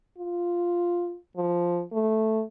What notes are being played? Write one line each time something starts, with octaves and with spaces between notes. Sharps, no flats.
F4
F3
A3